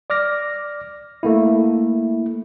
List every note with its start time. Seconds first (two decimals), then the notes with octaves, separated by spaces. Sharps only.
0.10 D5 D6 F6 A#6
1.23 A3 A#3 E4